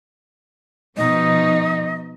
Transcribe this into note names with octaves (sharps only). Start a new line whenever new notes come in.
B2 F3 D#4 D#5